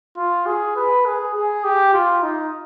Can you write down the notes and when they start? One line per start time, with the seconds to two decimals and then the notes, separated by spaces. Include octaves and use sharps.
0.17 F4
0.46 G#4
0.76 B4
1.06 G#4
1.35 G#4
1.64 G4
1.94 F4
2.23 D#4